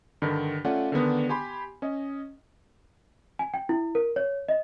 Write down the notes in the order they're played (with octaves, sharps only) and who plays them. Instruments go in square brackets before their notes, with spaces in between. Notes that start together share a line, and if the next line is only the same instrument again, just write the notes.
[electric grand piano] G2 D3 D#3
A3 C#4 F4 D5 F#5
D3 D#3 G#3 B3 D4
G4 G#5 B5 C6
C#4 D#5
[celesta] G#5
G5
E4
A#4
C#5
D#5